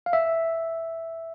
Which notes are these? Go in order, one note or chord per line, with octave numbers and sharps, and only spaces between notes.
F5
E5